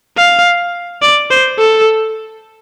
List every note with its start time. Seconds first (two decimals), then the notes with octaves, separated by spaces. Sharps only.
0.17 F5
1.02 D5
1.31 C5
1.59 A4